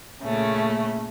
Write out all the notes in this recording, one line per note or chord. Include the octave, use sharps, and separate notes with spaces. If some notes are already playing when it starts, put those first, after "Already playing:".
A#2 C#3 A3 C#4